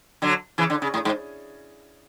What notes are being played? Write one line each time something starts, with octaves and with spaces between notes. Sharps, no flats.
D3 F#3
C#3 E3
D3
C#3
A2
G#2